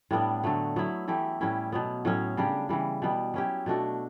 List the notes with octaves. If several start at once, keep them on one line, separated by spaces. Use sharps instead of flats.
A2 G3 B3 D4
D3 F#3 A3
F#3 B3 E4
E3 A3 E4 G4
A2 G3 C#4 E4
B2 F#3 B3
A2 F#3 C#4
C#3 G3 D4 G4
C#3 E3 G3
B2 G3 B3
F#3 C#4 E4 G4
B2 A3 D4 F#4